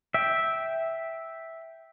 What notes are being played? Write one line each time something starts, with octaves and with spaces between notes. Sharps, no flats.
E5 G5